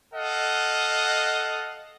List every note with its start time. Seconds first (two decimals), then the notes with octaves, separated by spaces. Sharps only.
0.14 A4 D#5 F5 F#5